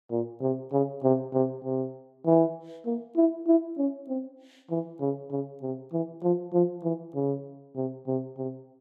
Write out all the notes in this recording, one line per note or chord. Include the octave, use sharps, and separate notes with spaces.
A#2
C3
C#3
C3
C3
C3
E3
A#3
E4
E4
C#4
C4
E3
C#3
C#3
C3
E3
F3
F3
E3
C#3
C3
C3
C3